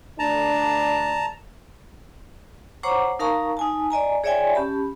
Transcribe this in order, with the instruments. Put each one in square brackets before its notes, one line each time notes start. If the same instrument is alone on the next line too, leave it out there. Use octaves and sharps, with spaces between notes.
[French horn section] D2 D4 [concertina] A5 A#5
[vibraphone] C5 C#5 F#5 A#5 C#6 D6
D#4 A#4 F5 A5 A#5 C#6
D#4 G#5 A5
D5 D#5 G#5 A#5
G#4 C#5 D5 E5 G5 G#5
C#4 G4 A5 B5